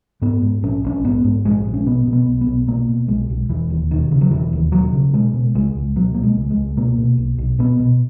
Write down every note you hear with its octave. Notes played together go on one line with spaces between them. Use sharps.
G#2 B3
G#2
A#1 C#4
A#1 C#4
G#2 B3
G#2
A#1 G#3
A#1
C#4
B2 B3
B2
B3
B1
B3
B1
B2 A#3
B2
B1 G#3
B1
E1 E3
D#2
E1 D#3
C#3
F#3
E1 E3
D#2
E1 F#3
C#3
B2 G#3
B2
C#2 G#3
C#2
B2 F#3
B2 A#3
G#3
C#2
G#3
C#2
B2 A#3
B2
B1
B1
B2 B3
B2